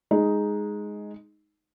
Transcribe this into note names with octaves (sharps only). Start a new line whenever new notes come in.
G#3 D#4